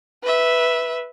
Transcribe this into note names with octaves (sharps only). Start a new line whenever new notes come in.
B4 E5